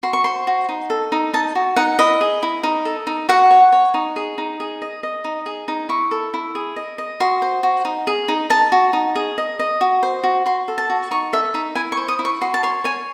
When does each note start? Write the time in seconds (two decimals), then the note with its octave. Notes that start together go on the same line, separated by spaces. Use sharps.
0.03 F#4 C6
0.13 C#6
0.24 C5 C6
0.47 F#4
0.69 D#4
0.90 A4
1.12 D#4
1.34 D#4 A5
1.55 F#4
1.76 D#4 F#5
1.99 E4 D#5
2.21 G#4
2.43 E4
2.63 D#4
2.85 A4
3.07 D#4
3.29 F#4 F#5
3.51 C#5
3.72 C#5
3.94 D#4
4.16 G#4
4.38 D#4
4.60 G#4
4.82 D#5
5.03 D#5
5.24 D#4
5.46 G#4
5.68 D#4
5.89 E4 C#6
6.11 A4
6.34 E4
6.55 G#4
6.76 D#5
6.98 D#5
7.20 F#4 C6
7.42 C5
7.63 F#4
7.85 D#4
8.07 G#4
8.28 D#4
8.50 D#4 A5
8.72 F#4
8.93 D#4
9.16 G#4
9.38 D#5
9.59 D#5
9.81 F#4
10.03 C5
10.24 F#4
10.46 F#4 C6
10.68 A4
10.78 A5
10.90 F#4
11.11 D#4 C#6
11.33 A4 E5
11.54 D#4 E5
11.75 E4 G#5
11.92 C#6
11.97 C5
12.08 D#6
12.19 E4
12.25 C#6
12.41 F#4 C6
12.54 A5
12.63 C#5 C6
12.84 C#5 G#5